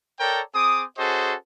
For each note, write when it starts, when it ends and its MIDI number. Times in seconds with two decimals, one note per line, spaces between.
0.20 0.41 69
0.20 0.41 70
0.20 0.41 73
0.20 0.41 74
0.20 0.41 79
0.20 0.41 82
0.54 0.83 60
0.54 0.83 68
0.54 0.83 86
0.54 0.83 87
0.98 1.34 61
0.98 1.34 66
0.98 1.34 68
0.98 1.34 69
0.98 1.34 72
0.98 1.34 75